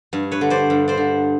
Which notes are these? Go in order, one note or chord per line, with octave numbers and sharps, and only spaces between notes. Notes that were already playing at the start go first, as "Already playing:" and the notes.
G2
B4 C#5
D3
C5 D5
G2
C5 D5
D3